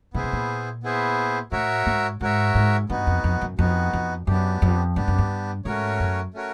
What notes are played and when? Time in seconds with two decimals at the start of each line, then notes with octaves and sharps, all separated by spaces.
0.14 A#2 B3 E4 G#4 C5
0.23 B2
0.33 A#2
0.83 B3 E4 G#4 C5
1.52 A2 F#4 A#4 C#5 E5
1.86 G#2
2.21 G#2 F#4 A#4 C#5 E5
2.55 G#2
2.90 G2 B3 D#4 F#4
3.07 F2
3.24 F2
3.41 F#2
3.58 F2 B3 D#4 F#4
3.93 F2
4.27 F#2 B3 D4 G4
4.62 F2
4.96 G2 B3 D4 G4
5.08 F#2
5.18 G2
5.65 G#2 A3 C#4 F#4 A#4 C#5
6.00 F#2
6.34 A3 C#4 F#4 A#4 C#5